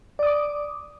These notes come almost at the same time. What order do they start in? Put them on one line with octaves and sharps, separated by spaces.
D5 D#6 D6